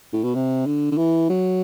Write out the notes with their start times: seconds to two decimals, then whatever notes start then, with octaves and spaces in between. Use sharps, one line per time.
0.13 A2
0.24 B2
0.35 C3
0.66 D3
0.91 D3
0.97 E3
1.30 F#3